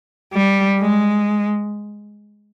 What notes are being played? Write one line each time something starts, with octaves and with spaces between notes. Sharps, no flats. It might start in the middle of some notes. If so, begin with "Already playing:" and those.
G3
G#3